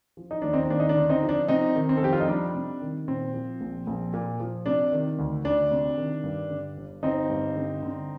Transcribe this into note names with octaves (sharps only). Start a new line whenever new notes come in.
F3
D#4
D#2 D4
C4 D#4
C4
D#2 D4
D#4
D4
D3
C4 D#4
F3
D4
C3 C4 D#4
D#3
C4
A4
F2 G4
F4
D#4
G3 D4
C3
D#3
A#2 C4
F3
A#1
A#1
A#2
F3
C3 D4
D#3
D2
D2 D4
C3
D#3
G2
D3
G1
G1 C4 D#4
G2
D3
D3